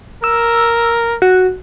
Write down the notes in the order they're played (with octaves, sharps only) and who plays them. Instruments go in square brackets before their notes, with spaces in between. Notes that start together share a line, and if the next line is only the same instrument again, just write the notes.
[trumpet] A#4 [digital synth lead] E6
[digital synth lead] F#4